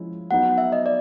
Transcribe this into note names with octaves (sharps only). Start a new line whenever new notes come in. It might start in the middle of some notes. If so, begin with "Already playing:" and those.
Already playing: F3 G#3 C#4 E4
F#3 B3 D#4 F#5
E5
D#5
D5